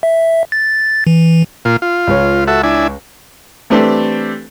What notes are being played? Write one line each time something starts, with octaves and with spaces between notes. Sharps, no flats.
E5
A6
E3
A#2 F4
F4
C#2 C#5
F#4 A4 E5
D4 E4 G#5
E3 A3 C4 D4 G4 A4